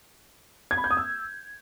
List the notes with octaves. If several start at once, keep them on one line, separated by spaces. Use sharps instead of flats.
G#6
B5
G6
D#6
E6